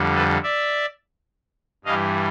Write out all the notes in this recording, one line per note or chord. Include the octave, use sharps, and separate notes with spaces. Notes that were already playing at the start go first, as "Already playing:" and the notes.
Already playing: F2 D3 G3
A4 B4
D5 E5
G2 E3 G3 D#5 F5